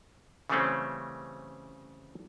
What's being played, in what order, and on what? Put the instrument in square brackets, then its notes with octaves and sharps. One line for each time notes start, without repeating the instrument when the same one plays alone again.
[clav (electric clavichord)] C#3 E3 G3 A3 C4 C#4